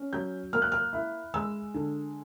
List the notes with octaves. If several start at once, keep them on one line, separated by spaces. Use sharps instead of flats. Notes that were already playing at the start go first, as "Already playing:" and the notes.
Already playing: C#4
F#3 G6
A#3 F6
F#6
F6
E4
G#3 E6
D3